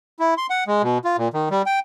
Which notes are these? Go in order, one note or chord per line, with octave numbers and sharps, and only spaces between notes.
E4
C6
F#5
G#3
B2
F4
A#2
D#3
G3
G5